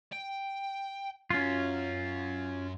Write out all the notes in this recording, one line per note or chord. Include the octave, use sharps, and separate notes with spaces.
G5
F#2 F#3 C#4 F4